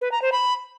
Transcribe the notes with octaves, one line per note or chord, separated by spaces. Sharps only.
B4
A#5
C5
B5